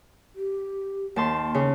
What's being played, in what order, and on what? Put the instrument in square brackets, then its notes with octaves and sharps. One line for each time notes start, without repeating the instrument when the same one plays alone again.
[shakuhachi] G4
[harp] D#2 A5 C6 [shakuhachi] A#3
[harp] C#3